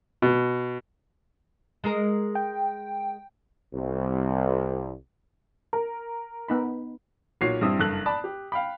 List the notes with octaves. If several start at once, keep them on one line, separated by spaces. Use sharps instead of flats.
B2
G#3 G#4 A#4
G5
C2
A#4
B3 D#4 B5
B1 A#2 F#4 C#5 C7
G2 G3 C4 E4 D#6
F#1 G2 A4 F#6 F#7
D5 A5 B5
G4
F5 G5 B5